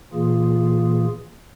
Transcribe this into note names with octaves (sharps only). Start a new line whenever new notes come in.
A#2 E3 A#3 F4 G#4